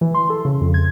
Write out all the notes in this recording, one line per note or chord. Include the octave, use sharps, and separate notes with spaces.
E3
C6
A4
C#3
F2
G#6